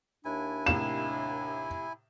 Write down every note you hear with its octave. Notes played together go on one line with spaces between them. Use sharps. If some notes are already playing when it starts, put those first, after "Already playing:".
D#2 D4 E4 G#5
A2 C3 F5 E7